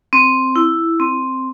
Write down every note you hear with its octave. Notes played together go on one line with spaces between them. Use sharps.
C4
E4
C4